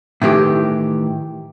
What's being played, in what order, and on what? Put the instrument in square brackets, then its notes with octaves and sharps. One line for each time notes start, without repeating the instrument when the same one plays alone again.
[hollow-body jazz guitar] A2 D#3 E3 G4